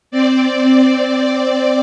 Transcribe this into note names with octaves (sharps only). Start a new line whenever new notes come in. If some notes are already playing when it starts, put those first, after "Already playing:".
C4 D5